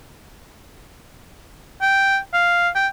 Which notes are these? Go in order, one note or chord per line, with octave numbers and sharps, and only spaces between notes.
G5
F5
G5